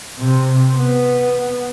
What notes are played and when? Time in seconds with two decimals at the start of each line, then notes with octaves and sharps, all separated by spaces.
0.19 C3
0.76 B3